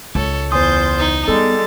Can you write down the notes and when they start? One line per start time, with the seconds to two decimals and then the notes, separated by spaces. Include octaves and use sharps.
0.15 C#2 A4 C#5
0.52 E2 C5 G#5 C6 D#6 G6 A6
0.99 D#4
1.28 G3 G#3 B3 A4 A5 A6